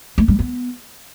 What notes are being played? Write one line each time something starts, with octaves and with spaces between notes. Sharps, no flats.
A3
G3
B3